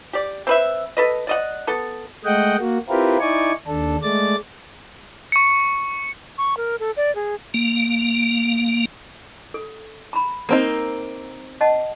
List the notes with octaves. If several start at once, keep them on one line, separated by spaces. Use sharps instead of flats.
G4 D5
C4 B4 E5
A4 B4 D#5
D5 D#5 F#5
B3 A4
G#3 A3 D#5 F#5 G5
A#3 F#4
C4 E4 F4 G4 A#4 B4
D#4 E4 D5 G#5 C#6
D#2 D4 A4
G#3 A3 D5 A6
C#6 C#7
C#6
A#4
A4
D5
G#4
A#3
A4
A#5 B5
A#3 C4 D#4
D#5 F#5 A5